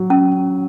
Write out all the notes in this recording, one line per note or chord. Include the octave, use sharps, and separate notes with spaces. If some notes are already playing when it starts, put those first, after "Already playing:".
Already playing: F#3
C#4